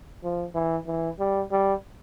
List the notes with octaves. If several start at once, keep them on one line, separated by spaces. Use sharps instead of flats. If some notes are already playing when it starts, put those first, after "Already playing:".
F3
E3
E3
G3
G3